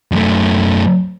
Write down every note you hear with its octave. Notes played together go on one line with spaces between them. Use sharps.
F#2 A3